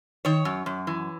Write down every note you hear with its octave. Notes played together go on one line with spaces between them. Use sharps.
D#3 C#5
F#2
F#2
E3